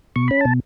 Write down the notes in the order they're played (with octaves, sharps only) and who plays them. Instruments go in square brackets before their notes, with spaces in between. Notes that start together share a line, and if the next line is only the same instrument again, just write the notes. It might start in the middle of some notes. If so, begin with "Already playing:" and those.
[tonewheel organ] B2 C#6
C#4 B5
B2 A5